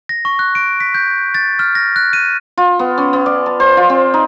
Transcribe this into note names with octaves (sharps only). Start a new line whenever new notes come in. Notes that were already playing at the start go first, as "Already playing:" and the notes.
A#6
C#6
F#6
D7
B6
G6
A6
F6
A#6
F#6
D#7
F4
B3
C#4
B3
D5
A5
C5
F4
C4
D#4